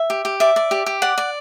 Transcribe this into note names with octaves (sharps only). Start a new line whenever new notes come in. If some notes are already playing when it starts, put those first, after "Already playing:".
Already playing: E5
G4
G4
D5 E5
D5
G4
G4
D5 F#5
D5